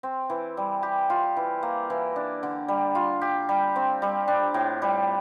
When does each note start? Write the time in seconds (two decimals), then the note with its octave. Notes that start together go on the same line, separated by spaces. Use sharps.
0.03 C4
0.30 E3
0.57 G3
0.83 G4
1.10 F4
1.37 E3
1.63 A#3
1.90 E3
2.16 D4
2.43 D3
2.68 G3
2.95 F4
3.21 G4
3.49 G3
3.76 C4
4.02 G3
4.28 D4
4.54 A2
4.82 G3